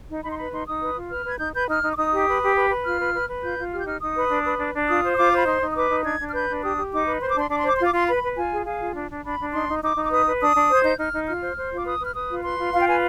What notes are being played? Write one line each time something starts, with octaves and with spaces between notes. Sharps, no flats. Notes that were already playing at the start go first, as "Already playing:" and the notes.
D#4
D#4 B5
C6
B4 B5
D#4 C6
D#4 D#6
B4
F4
B4 F6
B4 G#6
D#4 G6
B4 G6
D#4 F6
D#4
D6
D#4 D#6
G4
B4
G4
B4
B4
F4 F6
B4
B4
B4
F4 G6
F4
G4 F6
G6
D#4 F6
D#4 D#6
B4
D4
B4
D4
D4
F4 D#6
C5
D#6
F4 D6
C5 B5
D#4 C6
D#4
D#6
B4 D6
D#4
D4 G#6
D4
F6
B4 G6
D4
G4 D#6
G4
D#4 D6
B4
C5 C6
D6
D4 C6
D4 D6
C6
C5 D6
F4 C6
D6
F4 C6
B4 B5
B4
F4 G#5
G#4
G#4 F5
F4
D4
D4
D4 B5
D4
D#4 C6
D#4
D#4 D6
D#4
D6
B4 D#6
B4
D4 D#6
D4
C5 G#6
D#4 G6
D#4 F6
D#4
F4 F6
C5
C5
F4
D6
B4 D#6
B4 F6
B4 D#6
F4
B4 C6
F4
F4 F5
G5
B4 G#5